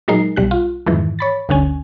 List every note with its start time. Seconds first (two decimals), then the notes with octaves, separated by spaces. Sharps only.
0.08 A#2 F#3 G#3 D#4 A#4 C7
0.36 B1 G3 F#6
0.51 F4
0.86 F2 G#2 D#3 E3
1.19 C#5 B5 A6
1.49 G1 D2 D3 C#4 G#5